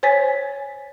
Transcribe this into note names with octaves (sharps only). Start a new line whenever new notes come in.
C5 C#5 G#5 A6 B6